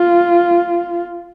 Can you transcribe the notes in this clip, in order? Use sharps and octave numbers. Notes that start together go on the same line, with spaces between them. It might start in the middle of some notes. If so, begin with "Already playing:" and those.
Already playing: F4